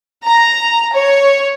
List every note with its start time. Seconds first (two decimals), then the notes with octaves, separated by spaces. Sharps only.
0.23 A#5
0.93 C#5